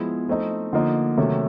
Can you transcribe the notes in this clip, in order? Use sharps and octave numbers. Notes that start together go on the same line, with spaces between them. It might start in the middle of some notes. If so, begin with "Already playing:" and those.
Already playing: F3 G#3 B3 E4
F3 A3 C4 D#4
D3 F3 A#3 D#4
C3 D#3 F#3 A3 C#4